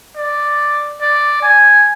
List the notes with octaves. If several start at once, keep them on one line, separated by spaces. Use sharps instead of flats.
D5
D5
G#5